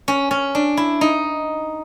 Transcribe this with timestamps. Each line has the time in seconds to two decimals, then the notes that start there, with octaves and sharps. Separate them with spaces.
0.08 C#4
0.31 C#4
0.55 D4
0.77 E4
1.01 D#4